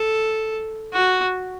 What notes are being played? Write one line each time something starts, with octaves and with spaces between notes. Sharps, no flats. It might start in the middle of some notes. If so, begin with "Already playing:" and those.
Already playing: A4
F#4